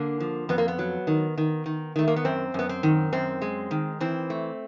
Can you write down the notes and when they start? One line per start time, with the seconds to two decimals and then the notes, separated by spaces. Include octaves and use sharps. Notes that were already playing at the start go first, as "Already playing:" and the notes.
Already playing: D3 A#3
0.20 F3
0.49 F2 B3
0.58 A#3
0.68 B3
0.79 F#3
1.07 D#3
1.38 D#3
1.66 D#3
1.96 D#3 A3
2.08 A#3
2.16 B3
2.25 F#2 C4
2.54 F#2 B3
2.69 C4
2.83 D#3
3.13 F#2 C4
3.42 G#3
3.71 D#3
4.00 E3 C4
4.30 A3